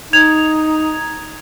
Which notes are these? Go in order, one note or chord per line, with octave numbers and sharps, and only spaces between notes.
D#4 G#6 F7